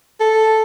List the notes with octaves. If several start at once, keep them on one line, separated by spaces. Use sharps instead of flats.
A4